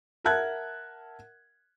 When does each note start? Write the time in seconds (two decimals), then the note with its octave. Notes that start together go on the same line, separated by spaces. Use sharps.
0.24 A#4 E5 F#5 A5 F#6 G#6